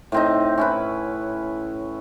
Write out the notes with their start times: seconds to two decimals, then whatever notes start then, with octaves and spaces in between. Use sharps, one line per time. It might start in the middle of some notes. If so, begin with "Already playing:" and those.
0.12 A2 C4 D#4
0.58 C#4 E4 B4